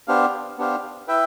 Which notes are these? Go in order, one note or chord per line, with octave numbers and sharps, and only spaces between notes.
B3 D4 G4 C5 F5
B3 D4 G4 C5 F5
E4 B4 E5 G5